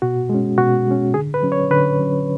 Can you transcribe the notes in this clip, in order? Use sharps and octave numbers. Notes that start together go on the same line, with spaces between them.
B2 F#4
G#3
C#4
B2 F#4
G#3 C#4
D3 G#4
B4
F#3 C#4
C#5
D3 B4
F#3 C#4